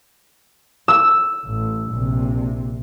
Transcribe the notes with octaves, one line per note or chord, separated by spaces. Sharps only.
E6
A1
A#1 C3